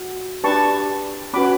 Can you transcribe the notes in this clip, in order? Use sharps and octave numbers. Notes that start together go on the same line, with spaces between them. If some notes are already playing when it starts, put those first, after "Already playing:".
Already playing: F#4
D4 G4 B4 A5 C#6
C#4 F#4 B4 B5 D6